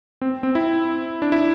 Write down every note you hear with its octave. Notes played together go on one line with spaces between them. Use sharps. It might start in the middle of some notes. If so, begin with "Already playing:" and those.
C4
C4
E4
D4
E4